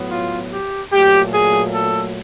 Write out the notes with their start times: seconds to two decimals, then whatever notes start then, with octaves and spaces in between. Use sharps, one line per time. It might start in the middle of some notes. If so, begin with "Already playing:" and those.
Already playing: A2 F#3 B3
0.09 F4
0.50 G4
0.90 A#2 F#3 A3 G4
1.32 G#4
1.73 A4